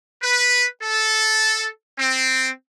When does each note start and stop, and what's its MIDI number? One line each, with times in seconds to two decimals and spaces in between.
0.22 0.66 71
0.82 1.67 69
1.98 2.49 60